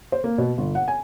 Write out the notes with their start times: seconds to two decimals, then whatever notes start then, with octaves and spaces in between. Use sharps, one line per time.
0.12 C5
0.24 A#3
0.38 B2
0.58 G1
0.75 F#5
0.88 G#5